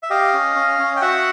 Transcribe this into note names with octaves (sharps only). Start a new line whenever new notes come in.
E5
G4 D#5 F5
C#4
C#4
C#4
G5
F#4 E5 F#5